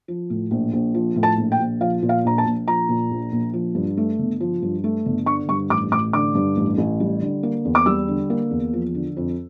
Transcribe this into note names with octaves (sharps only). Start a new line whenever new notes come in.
F3
A2
A#1
A#1
F3
A2
A5
A#1
G5
A#1
F3 F5
A#2
F5
A#1 A#5
A5
A#1
F3 A#5
A#2
A#1
A#1
F3
G2
A3
G1
F3
G2
A3
G1
D3 C#6
G2 C#6
A1 D6
A1 D6
D3 D6
G2
A1
A1
G3
D3
A#3
E2
D6
G3 E6
D3
A#3
E2
F3
D3
F2